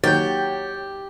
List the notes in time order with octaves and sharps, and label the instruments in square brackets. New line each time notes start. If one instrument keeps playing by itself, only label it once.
[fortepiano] D#3 F#3 A#3 [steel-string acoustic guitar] G4 [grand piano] C#5 F#5 [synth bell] G6 A6